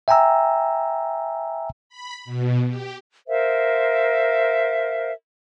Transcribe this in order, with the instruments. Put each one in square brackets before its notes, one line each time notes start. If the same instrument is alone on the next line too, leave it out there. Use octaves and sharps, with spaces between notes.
[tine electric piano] E5 G5 G#5 A#5 E6
[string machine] B5
B2
G4
[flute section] A#4 C5 E5 F5